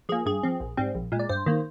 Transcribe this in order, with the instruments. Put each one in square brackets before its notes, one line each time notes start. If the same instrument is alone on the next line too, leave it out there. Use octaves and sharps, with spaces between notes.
[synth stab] F3 A#3 G#4
G2 G#4
F3 C4
A#1
G#2 G3 C4
A#1
A#2 G#3
D5
G2 C5
D#3 A#3